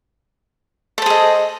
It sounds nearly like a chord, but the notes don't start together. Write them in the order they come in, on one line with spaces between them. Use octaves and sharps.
A4 C5 G#4 D#5